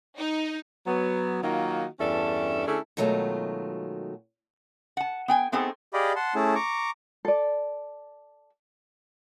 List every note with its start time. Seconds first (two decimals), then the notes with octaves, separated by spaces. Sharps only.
0.18 D#4
0.87 F#3 B3
1.42 D#3 F#3 A#3 D#4 F4 F#4
2.00 E2 G2 C#4 D4 A4 E5
2.67 D3 A3 C#4 E4 G#4 A4
2.97 B2 D#3 F#3 G#3 A3 F4
4.97 F#5 A5
5.28 B3 G5 G#5
5.52 A3 B3 C4 D#4 G#4 A4
5.94 G4 G#4 D5 D#5 F5 B5
6.16 F#5 A5 C6
6.35 A3 C#4 E4 G#4 A5
6.55 A#5 C#6 D6
7.25 A4 D5